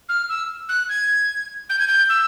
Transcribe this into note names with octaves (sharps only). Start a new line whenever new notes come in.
F6
E6
F#6
G#6
G6
G#6
G6
E6